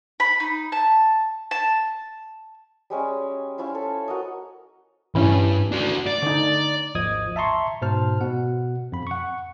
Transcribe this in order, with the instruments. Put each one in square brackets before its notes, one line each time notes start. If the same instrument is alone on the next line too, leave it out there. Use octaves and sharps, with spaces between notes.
[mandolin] B5
D#4
A5
A5
[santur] G3 G#3 C#4
C#4 E4 F4 C5
A4
F#4 A#4 D#5
[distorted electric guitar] C2 G2 [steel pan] E3 C#4
[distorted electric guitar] D4 F#4
D5
[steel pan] D3 D#4
[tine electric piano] G#1 D#2 F3 D#5 D#6 G#6
E5 A5 A#5 C6 C#6
G#2 B2 C5 A5 F6
B2 F#5
F2 B5
F#5 C#6